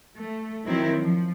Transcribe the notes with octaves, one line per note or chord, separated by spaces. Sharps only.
A3
D#3 F#3 C4 E4
F3